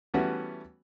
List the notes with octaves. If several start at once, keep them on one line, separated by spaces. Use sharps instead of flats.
E3 G3 A3 B3 C#4 F#4